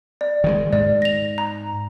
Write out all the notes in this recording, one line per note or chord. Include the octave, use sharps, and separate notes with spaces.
D5
D#3 E3 G#3
G#2 D5
A#6 F7
A#5